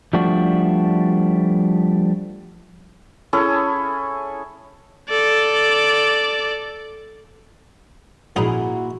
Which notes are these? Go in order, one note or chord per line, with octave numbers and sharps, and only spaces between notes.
F3 G3 A3 D4 F#4
C#4 E4 G#4 A4
A4 D5
A#1 A#2 D#4 E4 F#4 G#4